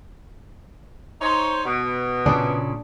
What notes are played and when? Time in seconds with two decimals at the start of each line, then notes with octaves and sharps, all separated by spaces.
1.21 D#4 C5 C#5
1.65 B2
2.26 A#2 C#3 D4 G#4